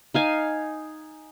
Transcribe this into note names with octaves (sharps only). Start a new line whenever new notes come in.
D#4 F5 G#5